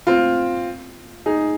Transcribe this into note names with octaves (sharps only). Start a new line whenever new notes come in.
C4 F4
D#4 G#4